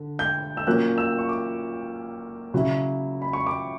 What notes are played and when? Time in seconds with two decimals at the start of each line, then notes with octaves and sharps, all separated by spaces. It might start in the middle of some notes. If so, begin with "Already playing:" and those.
Already playing: D3
0.19 G6
0.57 E6
0.66 A#2 F#3 A#3 C#4 F#6
0.98 E6
1.19 C#6
1.29 D6
2.54 C#3 F#3 C#4 E4
3.22 B5
3.33 C#6
3.47 D6